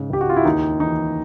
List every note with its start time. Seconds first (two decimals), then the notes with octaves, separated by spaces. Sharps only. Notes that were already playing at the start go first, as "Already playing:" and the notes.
Already playing: G#2 C#3
0.10 C#2 G4
0.21 F#4
0.29 F4
0.36 E4
0.45 D#2 D#4
0.80 E3 D#4